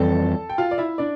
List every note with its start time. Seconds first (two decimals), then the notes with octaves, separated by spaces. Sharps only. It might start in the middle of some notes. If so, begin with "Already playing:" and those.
Already playing: F2 E3 G3 C4 A4 A5
0.49 G5
0.58 F4 F5
0.71 D5
0.78 E4 E5
0.98 D4 D5